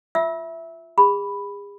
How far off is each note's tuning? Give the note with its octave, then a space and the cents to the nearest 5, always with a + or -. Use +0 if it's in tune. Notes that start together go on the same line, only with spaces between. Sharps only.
F4 +0 E5 +0 E6 -20
G#4 -40 B5 +0